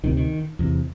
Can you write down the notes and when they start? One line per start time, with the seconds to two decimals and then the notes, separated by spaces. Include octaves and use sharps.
0.04 D2 C3 D#3
0.17 D#3
0.59 E2 C3